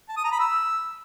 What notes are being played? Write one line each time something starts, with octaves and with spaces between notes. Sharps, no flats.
A5
D#6
A#5
B5
E6